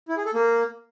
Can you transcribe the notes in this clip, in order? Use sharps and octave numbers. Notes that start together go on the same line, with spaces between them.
E4
G#4
A4
A#3